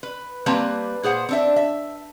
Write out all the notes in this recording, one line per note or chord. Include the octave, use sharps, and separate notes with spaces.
B4
G3 A#3 C4 B4 A5 A#5
A#2 G#4 C5 F#5
C4 D4 E5
E5